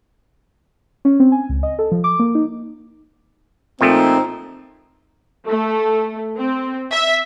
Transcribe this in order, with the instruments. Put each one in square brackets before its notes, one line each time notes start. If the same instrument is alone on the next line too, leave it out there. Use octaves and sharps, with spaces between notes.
[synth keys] C#4
C4
G#5
C#2
D#5
A4
F3
D6
A#3
D#4
[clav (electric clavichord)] A#2 F3 A3 [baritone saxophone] C4 [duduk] D#4
[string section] A3
C4
E5